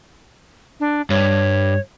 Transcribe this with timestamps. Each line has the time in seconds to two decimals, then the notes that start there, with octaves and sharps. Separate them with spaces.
0.80 D4
1.10 G2 C#5